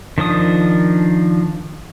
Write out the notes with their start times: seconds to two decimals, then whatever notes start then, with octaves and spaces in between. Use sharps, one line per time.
0.18 D#3 F3 D4 D#6